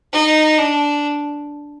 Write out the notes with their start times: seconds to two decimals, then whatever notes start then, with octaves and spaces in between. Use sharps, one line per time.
0.13 D#4
0.58 D4